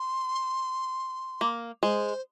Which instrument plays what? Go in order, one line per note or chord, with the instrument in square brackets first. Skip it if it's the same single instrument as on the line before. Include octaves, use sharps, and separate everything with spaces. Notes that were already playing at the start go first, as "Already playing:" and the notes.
Already playing: [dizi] C6
[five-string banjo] A#3
[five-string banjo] G#3 [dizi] C5